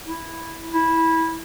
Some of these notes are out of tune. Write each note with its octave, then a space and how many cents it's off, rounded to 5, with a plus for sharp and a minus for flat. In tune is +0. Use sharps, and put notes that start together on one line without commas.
E4 -5
E4 -15